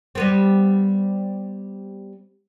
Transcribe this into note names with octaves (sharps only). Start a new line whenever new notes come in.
G3 B3 C4